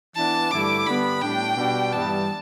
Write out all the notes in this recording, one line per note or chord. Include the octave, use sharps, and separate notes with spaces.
E3 B3 D4 A5
G2 D3 A3 E4 D6
D3 G3 B3 B5
A2 G3 D4 G5
B2 G3 D4
G2 E3 G3 B3 A5